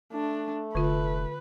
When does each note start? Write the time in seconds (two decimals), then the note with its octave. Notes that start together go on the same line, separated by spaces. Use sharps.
0.13 A3 D4
0.75 F1 D3 F4 B4